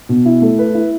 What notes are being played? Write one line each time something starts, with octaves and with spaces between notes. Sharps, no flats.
B2
E4
A3
B4
E4